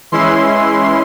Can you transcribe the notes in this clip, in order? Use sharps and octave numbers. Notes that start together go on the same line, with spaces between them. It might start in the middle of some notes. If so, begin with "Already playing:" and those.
E3 G#3 C#4 E4 C6